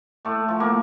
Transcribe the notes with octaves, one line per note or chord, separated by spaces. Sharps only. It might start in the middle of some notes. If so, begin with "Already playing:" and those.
A2 A3
F3
A#3